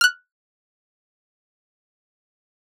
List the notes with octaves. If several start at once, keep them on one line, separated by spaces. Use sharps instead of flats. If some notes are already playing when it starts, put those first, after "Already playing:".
F6 F#6